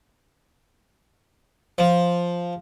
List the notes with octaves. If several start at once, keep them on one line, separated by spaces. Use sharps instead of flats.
F3